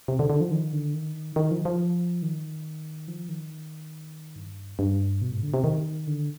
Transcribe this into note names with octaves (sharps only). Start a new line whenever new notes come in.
C3
D3
D3
F3
D#3
D3
D#3
D#3
F3
F3
D#3
F3
D#3
G2
G2
B2
G#2
D3
C3
D#3
D3